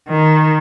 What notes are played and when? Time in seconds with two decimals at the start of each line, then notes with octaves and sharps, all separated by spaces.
0.09 D#3